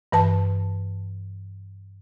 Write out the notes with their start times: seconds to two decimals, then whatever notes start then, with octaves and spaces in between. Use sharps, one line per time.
0.12 G2 E3 B4 A5